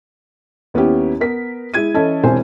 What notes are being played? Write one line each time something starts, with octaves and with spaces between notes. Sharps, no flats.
D#2 B3 C#4 E4 G4
B3 A#4 B6
G#3 E4 G#6 D#7
E3 C#4 E4 A4 D#5
E1 C3 E4 C5 G#5